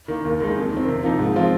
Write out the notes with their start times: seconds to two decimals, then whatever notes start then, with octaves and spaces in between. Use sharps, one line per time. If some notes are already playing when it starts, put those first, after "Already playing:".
0.08 D#3 A#3
0.25 D#2
0.40 D#3 G#3 D#4
0.56 F2
0.73 D#3 C4
0.88 C3
1.03 F3 A#3 D#4
1.19 G#2
1.36 F3 C4 F4